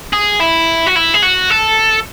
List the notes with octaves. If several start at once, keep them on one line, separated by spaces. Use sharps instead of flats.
G#4
E4
F#4
E4
G#4
F#4
A4